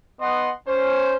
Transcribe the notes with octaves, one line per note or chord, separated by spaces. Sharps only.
B3 D#5 F#5 C6
C#4 C5